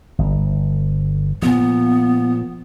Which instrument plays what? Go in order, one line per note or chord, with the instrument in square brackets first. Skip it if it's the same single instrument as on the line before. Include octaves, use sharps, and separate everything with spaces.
[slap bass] G1
[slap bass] A#2 F3 [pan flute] B3